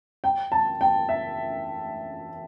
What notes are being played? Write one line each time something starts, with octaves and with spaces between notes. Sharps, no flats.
G5
A5
G5
E5